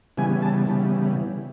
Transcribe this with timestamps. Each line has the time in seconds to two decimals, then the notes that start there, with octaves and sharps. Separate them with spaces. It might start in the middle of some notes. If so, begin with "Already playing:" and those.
0.17 C#3 E3 G3 B3 G#5
0.42 A5
0.67 C#3 E3 G3 B3